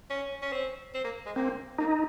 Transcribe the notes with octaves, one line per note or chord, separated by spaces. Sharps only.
C#4
C#4
C4
C4
A#3
G#3
A#3 C4
A#3 D#4